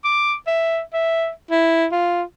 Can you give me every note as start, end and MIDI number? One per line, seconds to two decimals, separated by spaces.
0.04 0.35 86
0.47 0.80 76
0.93 1.30 76
1.51 1.86 64
1.92 2.23 65